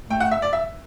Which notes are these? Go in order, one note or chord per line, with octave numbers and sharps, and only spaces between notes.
A3 G5
F#5
E5
D5
E5